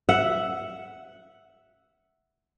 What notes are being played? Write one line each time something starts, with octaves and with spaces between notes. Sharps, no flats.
E5 F#5